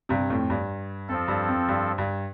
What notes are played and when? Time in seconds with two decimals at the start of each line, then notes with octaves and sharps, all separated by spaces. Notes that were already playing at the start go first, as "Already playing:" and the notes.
0.09 G2 C3
0.30 F2 A2
0.50 G2
1.08 F2 F3 C4 A4
1.28 G2
1.48 F2
1.69 G2
1.98 G2